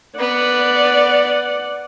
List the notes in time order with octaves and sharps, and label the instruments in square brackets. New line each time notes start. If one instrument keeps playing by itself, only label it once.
[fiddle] B3 [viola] D5 F#5